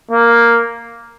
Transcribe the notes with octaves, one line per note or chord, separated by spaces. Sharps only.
A#3